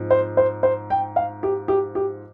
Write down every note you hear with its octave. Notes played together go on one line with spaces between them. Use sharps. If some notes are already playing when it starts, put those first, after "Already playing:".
Already playing: G#2 F3 C4
C5
C5
C5
G5
F5
G4
G4
G4